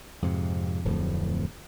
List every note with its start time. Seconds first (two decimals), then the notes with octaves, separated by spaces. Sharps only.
0.22 F2 G#2 C3
0.85 D1 F2 A2